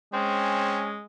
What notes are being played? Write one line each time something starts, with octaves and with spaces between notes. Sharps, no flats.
G#3 C4 C#4